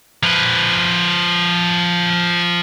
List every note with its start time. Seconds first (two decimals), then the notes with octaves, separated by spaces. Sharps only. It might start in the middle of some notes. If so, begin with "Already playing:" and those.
0.23 F3 B4